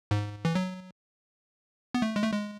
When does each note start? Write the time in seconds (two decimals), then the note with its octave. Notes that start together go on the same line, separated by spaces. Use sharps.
0.11 G#2
0.45 E3
0.55 F#3
1.94 B3
2.02 A3
2.16 G#3
2.23 A3
2.32 G#3